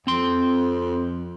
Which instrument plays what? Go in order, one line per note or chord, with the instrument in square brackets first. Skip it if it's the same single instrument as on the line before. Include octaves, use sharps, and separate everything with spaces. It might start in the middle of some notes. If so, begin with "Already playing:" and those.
[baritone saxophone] F2 [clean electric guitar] C4 C6